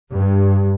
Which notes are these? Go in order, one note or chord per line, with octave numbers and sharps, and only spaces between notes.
G2